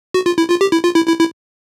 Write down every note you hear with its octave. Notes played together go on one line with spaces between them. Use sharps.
F#4
F4
E4
F4
G4
E4
F4
E4
E4
E4